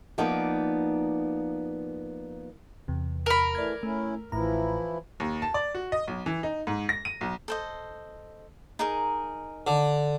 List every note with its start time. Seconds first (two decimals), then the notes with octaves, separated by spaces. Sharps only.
0.18 F3 A#3 B3 D#4 D5
2.88 E2 C3
3.26 A#4 B5
3.55 E3 A3 D5 G#6
3.83 A3 C#4 E4
4.32 A1 A2 E3 F3 E4 A#5
5.20 D#2
5.42 A5
5.54 D5
5.75 F#4
5.92 D#5
6.08 B1
6.26 E3
6.43 D#4
6.67 G#2
6.89 A#6
7.05 D#7
7.21 B1
7.48 A4 C5 D#5
8.79 D#4 G#4 A#4
9.67 D3